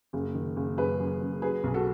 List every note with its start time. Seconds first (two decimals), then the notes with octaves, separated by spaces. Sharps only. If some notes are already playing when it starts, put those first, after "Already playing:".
0.13 F#1
0.35 D#3
0.56 F#1
0.78 F#2 G#4 B4
0.99 F#2
1.21 F#2
1.42 F#3 G#4 B4
1.64 B1 G#4
1.74 F#4 A4